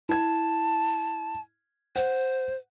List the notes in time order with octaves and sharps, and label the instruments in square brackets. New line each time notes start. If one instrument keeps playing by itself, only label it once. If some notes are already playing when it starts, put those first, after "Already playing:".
[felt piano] E4 G#6 [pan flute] A5
[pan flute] C5 [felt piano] F#5